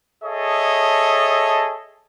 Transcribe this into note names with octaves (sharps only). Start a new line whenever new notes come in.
G#4 A4 C#5 D#5 E5 A5